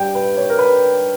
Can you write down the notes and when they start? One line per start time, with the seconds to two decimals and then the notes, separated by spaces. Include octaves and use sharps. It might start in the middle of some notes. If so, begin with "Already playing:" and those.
Already playing: G2 G3 G5
0.15 B4
0.37 C#5
0.50 A#4
0.59 B4